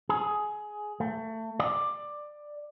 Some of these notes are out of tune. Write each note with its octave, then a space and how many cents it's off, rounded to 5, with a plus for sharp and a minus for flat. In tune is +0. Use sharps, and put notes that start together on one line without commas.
G#4 +15
A3 +25
D5 +15